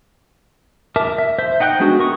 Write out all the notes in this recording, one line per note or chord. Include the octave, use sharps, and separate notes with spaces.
A#4 E5 A5 D6
E5
C5 E5
D#4 F#5 G5 D6 F#6
G#3 B3 D4 F#4 G#4
A#4 C#6 D#6